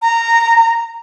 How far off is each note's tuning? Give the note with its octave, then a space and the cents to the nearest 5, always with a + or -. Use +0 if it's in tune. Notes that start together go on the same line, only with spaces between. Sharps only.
A#5 -15